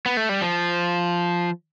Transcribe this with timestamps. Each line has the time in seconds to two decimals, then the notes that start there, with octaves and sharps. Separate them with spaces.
0.06 B3
0.17 A3
0.29 G3
0.42 F3